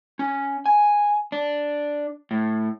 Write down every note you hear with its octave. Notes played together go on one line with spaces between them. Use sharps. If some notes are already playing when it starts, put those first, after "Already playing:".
C#4
G#5
D4
A2